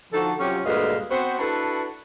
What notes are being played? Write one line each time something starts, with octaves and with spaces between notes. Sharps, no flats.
D3 F3 D#4 F#4 A4
C3 F#3 C#4 F4 G4
D2 G2 A#2 G#3 D#5 F5
B3 C4 F#4 C5
D4 E4 F#4 A4 B4